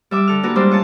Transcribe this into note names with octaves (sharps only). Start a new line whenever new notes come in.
G3 E5 D6
D3 A4 F6
A#3 D4 E4 F#4 A#4 B4
G3 G#3 C5 D5 E5
C#4 F4 C#5 A5